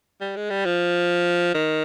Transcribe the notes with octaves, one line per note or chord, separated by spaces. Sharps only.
G3
G#3
G3
F3
D#3